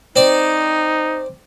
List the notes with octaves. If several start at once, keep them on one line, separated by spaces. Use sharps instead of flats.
C4 D#4 D5